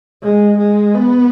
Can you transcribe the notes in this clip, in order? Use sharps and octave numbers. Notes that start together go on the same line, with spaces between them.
G#3
G#3
B3